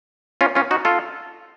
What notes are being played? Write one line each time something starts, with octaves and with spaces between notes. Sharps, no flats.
C#4 F4
C#4 F4
D#4 F#4
F4 A4